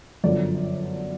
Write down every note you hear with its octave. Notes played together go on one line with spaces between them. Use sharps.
G1 F#2 D3 F3 D5